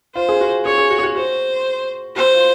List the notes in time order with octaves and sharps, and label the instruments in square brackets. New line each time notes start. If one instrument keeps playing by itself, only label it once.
[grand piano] F4 [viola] C5
[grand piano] G#4
F#4
[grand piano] G#4 [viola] C#5
[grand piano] G#4
F#4
G#4
F#4
[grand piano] F#4 [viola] C5
[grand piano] F#4 [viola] C5
[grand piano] F4